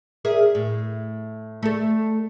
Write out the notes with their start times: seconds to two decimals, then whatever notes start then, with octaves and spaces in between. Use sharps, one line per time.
0.25 G#4 A#4 E5
0.55 A2
1.63 A3 A4